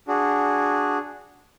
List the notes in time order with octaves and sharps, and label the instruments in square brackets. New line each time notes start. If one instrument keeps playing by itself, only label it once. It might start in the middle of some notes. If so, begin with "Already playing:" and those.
[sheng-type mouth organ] D4 F#4 G#4